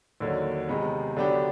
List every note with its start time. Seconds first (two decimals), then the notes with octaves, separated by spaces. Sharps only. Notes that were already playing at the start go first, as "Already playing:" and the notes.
0.20 D#2 D3 F#3
0.69 C3 D#3 G#3 B3
1.16 D3 F#3 B3 D4 G4